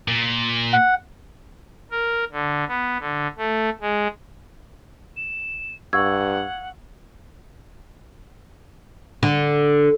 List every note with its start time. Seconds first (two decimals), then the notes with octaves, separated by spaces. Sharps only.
0.08 A#2
0.73 F#5
1.91 A#4
2.32 D3
2.69 B3
3.00 D3
3.38 A3
3.81 G#3
5.16 E7
5.93 G2 F5 F#5 C#6 E6 G#6
9.23 D3